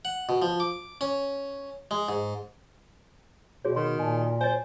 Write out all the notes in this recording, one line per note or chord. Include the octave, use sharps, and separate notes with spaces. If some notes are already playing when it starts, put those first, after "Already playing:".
F#5
B2
F3
D6
C#4
G#3
G#2
B2 F#4 G#4 C#5
D#3 C6
A#2 G#5 A5
C5 C#5 D#5 G#5